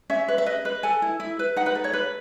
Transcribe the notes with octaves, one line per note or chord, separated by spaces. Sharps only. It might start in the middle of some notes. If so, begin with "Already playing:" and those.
C#4 E5
B4
E5
B4 D#5
B4
A4 G#5
E4
E4
B4
D#4 F#5
B4
A4
C#5
B4